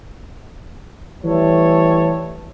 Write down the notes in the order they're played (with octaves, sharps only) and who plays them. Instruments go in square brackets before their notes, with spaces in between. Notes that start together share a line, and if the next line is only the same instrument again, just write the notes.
[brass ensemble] E3 G3 A3 A4 C#5